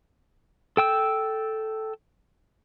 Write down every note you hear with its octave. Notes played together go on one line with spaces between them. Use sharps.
A4 G5 E6